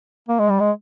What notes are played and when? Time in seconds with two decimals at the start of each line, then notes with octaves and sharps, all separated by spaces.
0.29 A#3
0.39 G#3
0.49 G3
0.60 G#3